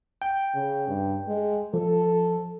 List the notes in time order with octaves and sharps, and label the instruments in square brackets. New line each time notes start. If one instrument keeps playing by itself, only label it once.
[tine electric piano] G5
[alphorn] C#3
G2
G#3
[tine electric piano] F3 [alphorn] A4